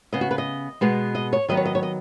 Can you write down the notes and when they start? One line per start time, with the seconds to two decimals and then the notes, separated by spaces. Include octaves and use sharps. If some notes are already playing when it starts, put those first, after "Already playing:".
0.13 C#3 B3 D#5
0.21 F#4
0.31 B4
0.38 D#5
0.81 B2 G#3 B3
1.15 D#5
1.33 C#5
1.48 D#3 F#3 B3 D#5
1.57 C#5
1.65 D#5
1.75 C#5
1.83 D#5